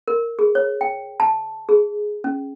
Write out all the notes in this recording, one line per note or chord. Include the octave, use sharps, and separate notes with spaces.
A#4
G#4
C#5
G5
A5
G#4
C#4